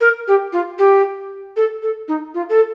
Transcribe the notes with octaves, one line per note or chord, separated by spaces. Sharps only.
A#4
G4
F4
G4
A4
A4
D#4
F4
A4